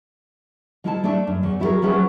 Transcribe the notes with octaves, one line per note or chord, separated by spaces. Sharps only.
F3 G#3 E4 A4 F#5 A5
A3 D4 A4 E5
F#2
E2 A3
F#3 E4 F4 G#4 A#4
F3 F#3 C#4 E4 G#4 B4